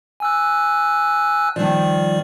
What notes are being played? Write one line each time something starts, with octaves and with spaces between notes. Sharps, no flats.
G#5 E6 F#6
D#3 F3 G3 D5